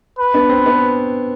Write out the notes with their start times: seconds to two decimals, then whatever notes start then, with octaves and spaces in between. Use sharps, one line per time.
0.19 B4
0.34 B3 D4
0.49 C4
0.66 B3 D4